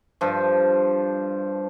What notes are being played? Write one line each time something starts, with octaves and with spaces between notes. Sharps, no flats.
G2 F3